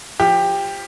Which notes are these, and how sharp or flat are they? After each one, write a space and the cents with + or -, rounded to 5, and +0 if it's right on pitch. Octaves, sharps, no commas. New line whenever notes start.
F3 +0 G4 +15